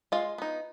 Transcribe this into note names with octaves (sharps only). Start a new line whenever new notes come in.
G#3 F4 F5
B3 D#4